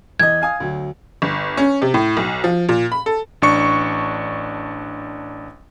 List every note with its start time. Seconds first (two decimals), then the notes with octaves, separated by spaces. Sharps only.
0.19 E2 D#5 G#6
0.41 F5 G#5 D#6
0.60 D2 F#3
1.22 G1
1.57 C#4
1.82 C3
1.94 A2
2.17 B1
2.44 F3
2.69 A#2
2.92 B5
3.06 A4
3.42 A1 D4 C#6 C#7